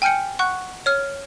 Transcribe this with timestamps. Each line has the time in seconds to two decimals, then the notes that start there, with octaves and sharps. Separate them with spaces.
0.02 G5 G#5 F6 G6 C#7
0.39 F#5 C#6 F#6
0.86 C#5 F6